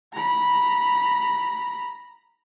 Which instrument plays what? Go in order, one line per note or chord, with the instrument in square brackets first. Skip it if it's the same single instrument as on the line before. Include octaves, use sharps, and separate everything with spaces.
[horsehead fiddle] A#5 B5